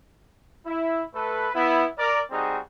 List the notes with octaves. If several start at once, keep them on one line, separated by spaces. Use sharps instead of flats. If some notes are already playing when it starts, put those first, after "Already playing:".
E4
A3 A4 B4
B3 E4
A#4 D5
G3 C4 D#4 F#4 G#4